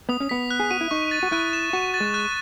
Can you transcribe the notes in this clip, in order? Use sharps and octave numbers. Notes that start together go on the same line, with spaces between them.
B3 D#6
C#4
B3 B6
F#6
G#4
F#4 D#7
E4
D#4 C#6
A6
F#4
E4 F#6
E7
F#4 C#6
A6
G#3
F#6